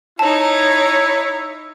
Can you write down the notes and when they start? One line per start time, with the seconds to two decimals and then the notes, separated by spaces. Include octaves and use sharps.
0.19 D#4 E4 C#5 A5